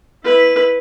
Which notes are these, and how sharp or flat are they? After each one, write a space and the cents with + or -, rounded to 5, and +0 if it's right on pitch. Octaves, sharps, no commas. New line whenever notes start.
E4 -10 B4 +0